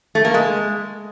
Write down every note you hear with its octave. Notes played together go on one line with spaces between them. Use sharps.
A3
A#3
G#3